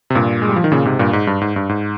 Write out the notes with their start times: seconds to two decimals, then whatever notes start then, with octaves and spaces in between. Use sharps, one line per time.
0.10 C3
0.15 G2 A#2
0.42 G#3
0.49 G3
0.56 F3
0.64 D#3
0.72 A#2 C#3
0.85 G#2 C3
0.99 G2 A#2
1.13 G#2
1.27 G2
1.41 G#2
1.56 G2
1.69 G#2